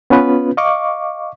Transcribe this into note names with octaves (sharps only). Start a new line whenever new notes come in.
B3 C#4 F4 B4
D#5 F5 C#6 D6